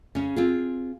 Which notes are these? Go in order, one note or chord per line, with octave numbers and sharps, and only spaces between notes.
C#3 C#4
C4 F4 G#4